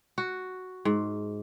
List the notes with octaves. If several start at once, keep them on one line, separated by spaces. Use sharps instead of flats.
F#4
G#2